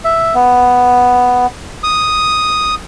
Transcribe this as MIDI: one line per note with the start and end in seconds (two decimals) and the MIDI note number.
0.05 0.35 76
0.35 1.46 59
1.83 2.75 87